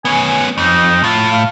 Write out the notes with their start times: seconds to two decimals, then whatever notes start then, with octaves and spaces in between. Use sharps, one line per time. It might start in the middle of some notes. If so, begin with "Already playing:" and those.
0.05 B3 C#4 G#5
0.58 F2 D#4
1.04 A2 F4
1.31 F5